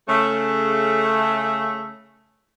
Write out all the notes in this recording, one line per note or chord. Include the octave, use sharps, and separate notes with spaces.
C#3 A3